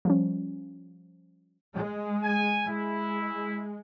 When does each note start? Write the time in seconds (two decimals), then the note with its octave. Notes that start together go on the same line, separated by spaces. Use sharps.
0.05 F3 G3 C#4
1.74 G#3
2.22 G#5
2.66 G#3 E4